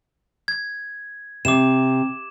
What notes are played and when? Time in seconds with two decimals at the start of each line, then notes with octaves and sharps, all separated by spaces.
0.48 G#6
1.45 C3 D6 E7